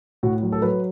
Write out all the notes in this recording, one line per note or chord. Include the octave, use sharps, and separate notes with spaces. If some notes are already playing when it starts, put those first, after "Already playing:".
A2 F#4
F#3
A4
F#3 B4